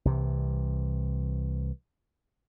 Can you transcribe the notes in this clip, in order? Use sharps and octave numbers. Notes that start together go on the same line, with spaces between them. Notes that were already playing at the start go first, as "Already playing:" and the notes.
C2 C3 E3